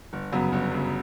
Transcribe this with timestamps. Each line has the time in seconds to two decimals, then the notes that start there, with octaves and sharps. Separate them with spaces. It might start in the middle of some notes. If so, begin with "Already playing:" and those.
0.13 G1
0.32 F#2 C#3 F#3 B3
0.52 G1
0.72 F#2 C#3 F#3 B3